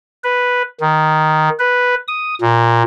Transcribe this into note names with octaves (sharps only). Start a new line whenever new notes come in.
B4
D#3
B4
D#6
A#2